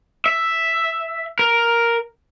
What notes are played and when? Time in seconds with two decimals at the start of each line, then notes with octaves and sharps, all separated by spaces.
0.26 E5
1.39 A#4